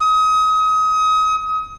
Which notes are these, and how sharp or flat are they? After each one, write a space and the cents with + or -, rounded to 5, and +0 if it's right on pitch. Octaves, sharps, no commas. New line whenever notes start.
D#6 +30